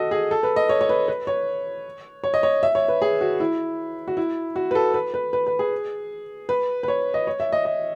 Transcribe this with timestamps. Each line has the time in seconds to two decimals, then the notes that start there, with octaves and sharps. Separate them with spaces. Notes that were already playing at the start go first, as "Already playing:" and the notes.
Already playing: F#4 A4 D#5
0.11 G#4
0.31 A4
0.43 B4
0.56 D#5
0.69 C#5
0.81 C#5
0.89 B4
1.08 B4
1.27 C#5
2.24 C#5
2.34 D#5
2.43 C#5
2.63 E5
2.75 C#5
2.88 B4
3.02 G#4
3.21 F#4
3.40 E4
4.08 F#4
4.17 E4
4.56 F#4
4.71 B4
4.75 A4
4.94 B4
5.14 B4
5.33 B4
5.47 B4
5.59 G#4
6.49 B4
6.83 B4
6.88 C#5
7.14 D#5
7.27 C#5
7.40 E5
7.52 D#5
7.65 D#5